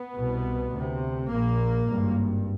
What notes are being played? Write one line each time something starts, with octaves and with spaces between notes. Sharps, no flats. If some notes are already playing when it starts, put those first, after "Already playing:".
Already playing: B3
C2 B2
D2 C3
A#1 A#2 A#3
G#1 G2